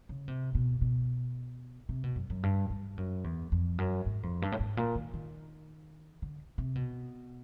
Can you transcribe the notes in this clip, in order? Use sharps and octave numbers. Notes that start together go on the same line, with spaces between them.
C#3
C3
B2
B2
C3
B2
F#2
F#2
G2
G2
F#2
E2
F2
F#2
G#2
F2
G2
A2
G#2
A#2
D#3
D#3
D3
C3
B2